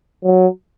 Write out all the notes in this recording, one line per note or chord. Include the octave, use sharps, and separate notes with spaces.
F#3